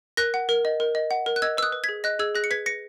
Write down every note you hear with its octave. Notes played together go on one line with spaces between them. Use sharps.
A#4 F#6 A#6
F#5
A#4
D#5
A#4
D#5
F#5
A#4
F#6
D#5 E6 G#6
B4 E6
D#6 F#6
B4
G#6 B6
G#4
D#5 F#6 A#6
G#4 E6 G#6
G#4 F#6 A#6
C#7
B4 G#6 B6
B4 A#6 C#7